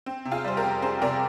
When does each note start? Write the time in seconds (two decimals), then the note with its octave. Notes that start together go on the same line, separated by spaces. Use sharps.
0.06 C4
0.25 C3
0.31 F4 G#4
0.44 G3 C5
0.57 G4 A#4
0.64 F2
0.82 C4 G#4 C5
1.02 C3 A#4 D5